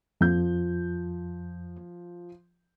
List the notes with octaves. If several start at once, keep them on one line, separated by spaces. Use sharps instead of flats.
F2 F3 G6